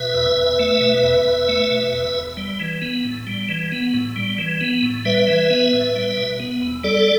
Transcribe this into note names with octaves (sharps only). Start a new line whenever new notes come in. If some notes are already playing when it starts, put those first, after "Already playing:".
Already playing: B2 B4 E5
E2
E2
A3
B2
E2
E2
A3
B2
E2
E2
G3
E3
B3
A2
G3
E3
B3
A2
G3
E3
B3
A2
G3 B4 E5
E3
B3
A2
G3
B2
B3
E2
G3 A4 D5